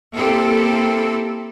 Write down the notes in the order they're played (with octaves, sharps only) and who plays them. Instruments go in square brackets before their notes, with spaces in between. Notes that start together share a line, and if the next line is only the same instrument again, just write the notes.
[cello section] A#3 C4 E4 G4 A4